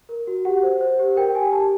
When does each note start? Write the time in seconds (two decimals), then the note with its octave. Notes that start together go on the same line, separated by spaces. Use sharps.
0.09 A#4
0.27 F#4
0.45 G4 F#5
0.63 C5
0.81 C5
0.99 G4
1.16 A#4 G5
1.35 G4 G#5
1.52 G4 A5